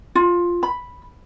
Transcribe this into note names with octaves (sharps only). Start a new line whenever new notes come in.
F4
B5